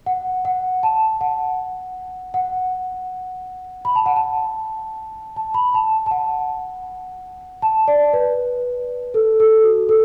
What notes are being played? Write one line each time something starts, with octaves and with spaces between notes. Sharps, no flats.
F#5
F#5
A5
F#5
F#5
B5
A5
F#5
A5
A5
B5
A5
A5
F#5
A5
D5
B4
A4
A4
F#4
A4